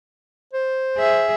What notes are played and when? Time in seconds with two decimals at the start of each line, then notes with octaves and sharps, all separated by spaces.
0.53 C5
0.98 G#4 E5